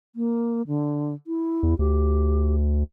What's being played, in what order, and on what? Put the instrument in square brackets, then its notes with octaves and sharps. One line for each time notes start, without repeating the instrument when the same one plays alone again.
[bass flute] A#3
D3
E4
[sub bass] E2
[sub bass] D2 [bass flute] G4